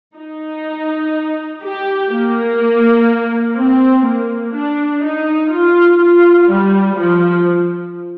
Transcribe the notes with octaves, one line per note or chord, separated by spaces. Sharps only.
D#4
G4
A#3
C4
A#3
D4
D#4
F4
F4
G3
F3